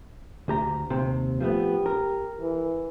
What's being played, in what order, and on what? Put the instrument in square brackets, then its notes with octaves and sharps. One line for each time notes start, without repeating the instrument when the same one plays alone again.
[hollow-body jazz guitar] D2 G4 A#5
D#2 C3
[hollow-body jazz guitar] F3 A3 B3 [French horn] G4
[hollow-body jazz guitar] A#4
[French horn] E3